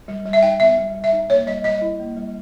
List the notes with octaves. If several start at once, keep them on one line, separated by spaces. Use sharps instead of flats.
G3
G3
E5
D#4 G5
B3 E5
G3
G3
E5
D#4
A#3 C#5
G3 D#5
G3 D#5
E4
A#3
G3